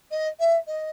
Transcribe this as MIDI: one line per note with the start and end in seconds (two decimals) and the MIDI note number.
0.11 0.28 75
0.40 0.57 76
0.67 0.90 75